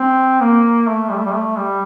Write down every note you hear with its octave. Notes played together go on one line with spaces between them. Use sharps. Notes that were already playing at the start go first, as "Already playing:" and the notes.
Already playing: C4
A#3
A3
G3
A3
G3
A3
G3